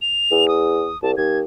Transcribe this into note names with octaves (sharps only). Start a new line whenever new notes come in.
F7
E2
D#6
C2 A5
D#2 G#6